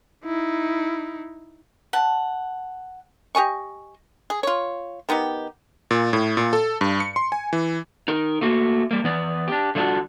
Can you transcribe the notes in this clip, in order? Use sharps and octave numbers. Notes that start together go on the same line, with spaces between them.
D#4 E4
F#5 A5
G4 D#5 G#5 C#6
G#4
F4 C#5
D#3 B3 D#4 G4
A#2
A2
A#2
A4
G2
C#7
C6
G#5
E3
D#4 A#4
A3 A#3 F#4
G3 A#3
E3 B3 D5
D4 G4
D3 G3 A3 D4 F4 F#4